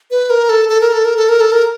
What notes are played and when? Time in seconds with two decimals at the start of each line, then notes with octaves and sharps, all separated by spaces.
0.11 B4
0.30 A#4
0.49 A4
0.69 A4
0.81 A#4
0.93 A4
1.05 A#4
1.17 A4
1.29 A#4
1.41 A4
1.52 A#4